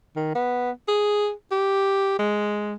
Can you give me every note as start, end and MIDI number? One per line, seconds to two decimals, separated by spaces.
0.16 0.32 51
0.35 0.71 59
0.88 1.32 68
1.51 2.15 67
2.19 2.75 56